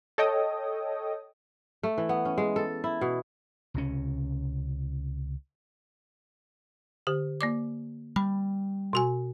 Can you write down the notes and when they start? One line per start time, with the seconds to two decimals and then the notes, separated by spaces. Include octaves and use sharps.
0.18 A4 C#5 D#5 G5 D#6
1.83 A3
1.98 E3
2.09 B3
2.25 C#4
2.38 G#3
2.56 A4
2.84 E4
3.01 B2
3.74 C#2 C3 C#4
7.07 D3 G4
7.41 A#3 D5 D6
8.16 G3 B5
8.93 B2 F#4 G#5